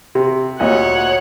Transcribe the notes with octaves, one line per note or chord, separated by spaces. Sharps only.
C3
D2 A#2 C#5 D#5 F#5